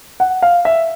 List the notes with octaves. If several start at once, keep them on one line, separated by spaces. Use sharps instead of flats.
F#5
F5
E5